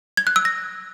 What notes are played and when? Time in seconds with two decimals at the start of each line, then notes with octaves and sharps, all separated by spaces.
0.17 G#6
0.27 F#6
0.36 E6
0.45 A#6